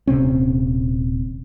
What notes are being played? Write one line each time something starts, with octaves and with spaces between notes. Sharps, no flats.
D#1 C3 C4 C#4